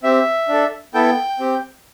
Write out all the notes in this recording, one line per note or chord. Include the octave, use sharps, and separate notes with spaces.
C4 G4 E5
D4 A4
B3 E4 A4 G5
C4 G4